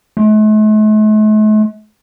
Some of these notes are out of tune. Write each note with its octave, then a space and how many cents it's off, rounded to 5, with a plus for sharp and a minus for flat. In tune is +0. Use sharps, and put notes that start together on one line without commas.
A3 -45